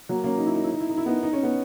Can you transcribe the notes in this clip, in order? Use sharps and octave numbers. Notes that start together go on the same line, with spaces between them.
F#3 A#3
A#3 C#4
D#4
E4
D#4
E4
D#4
E4
D#4
E4
B3 D#4
D#4
C#4
B3